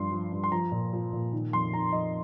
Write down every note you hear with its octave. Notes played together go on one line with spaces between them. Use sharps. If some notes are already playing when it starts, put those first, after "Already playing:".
Already playing: G2 F3 C6
F3
G2
C6
F3 A#5
A#2
F3
A#2
D#3
F2 C6
D#3 A#5
F2 D#5